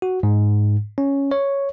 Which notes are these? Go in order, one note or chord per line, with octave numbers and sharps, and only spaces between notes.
F#4
G#2
C#4
C#5